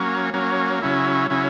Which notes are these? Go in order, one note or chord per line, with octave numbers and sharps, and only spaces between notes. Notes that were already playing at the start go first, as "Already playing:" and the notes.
Already playing: F#3 A#3 C#4
F#3 A#3 C#4
C#3 F#3 C#4 E4
C#3 F#3 C#4 E4